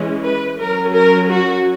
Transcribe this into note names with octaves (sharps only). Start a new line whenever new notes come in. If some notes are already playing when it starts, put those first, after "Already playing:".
Already playing: E3 G#3 C#4
B4
F#3 C#4 A#4
A#4
F#4